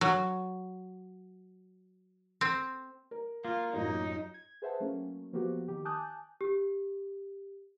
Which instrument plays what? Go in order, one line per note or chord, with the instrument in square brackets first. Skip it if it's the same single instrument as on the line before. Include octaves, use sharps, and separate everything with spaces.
[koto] F#3
C4
[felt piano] A#4
[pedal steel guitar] A#3 [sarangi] F4
[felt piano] A1 F#2 F4 [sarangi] D#4
[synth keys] G#6
G#4 B4 C5 E5 F#5 A5
F#3 A3 A#3 C#4
F3 A#3 B3 F#4 G4
D#3 G4
G#5 A5 D6 D#6 F#6 G6
[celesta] G4